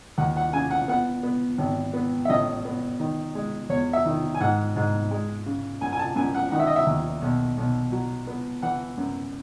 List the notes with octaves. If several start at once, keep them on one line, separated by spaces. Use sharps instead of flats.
D#2 F#5
F#5
C#3 G#5
F#5
B3 F#5
B3
G#1
B3
E5
A1 D#5
B3
D#3
G#3
E2 C#5
E5
D#3
G#5
G#2 F#5
G#2
G#3
C#3
F#2 G#5
G#5
A5
F#2 G#5
F#5
D#3 F#5
E5
D#5
E5
D#2
B1
B1
F#3
B3
E3 F#5
F#2